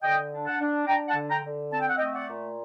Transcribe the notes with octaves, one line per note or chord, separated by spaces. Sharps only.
D3 D#5 G5
D4
F#5 A5
D4
D4 G5 A#5
F#5 A5
D3
G5 A#5
D3
C4 A5
G5
F#5
A3 D#5 G5
D5 F#5
A#2